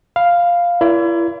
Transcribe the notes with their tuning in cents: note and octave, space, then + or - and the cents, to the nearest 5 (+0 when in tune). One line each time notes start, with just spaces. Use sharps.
F5 +0 B5 +0
E4 +35 A#4 +40 D5 -40